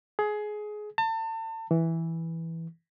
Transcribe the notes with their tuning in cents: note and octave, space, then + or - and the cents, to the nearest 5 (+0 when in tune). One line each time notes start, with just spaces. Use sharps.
G#4 +20
A5 +35
E3 -5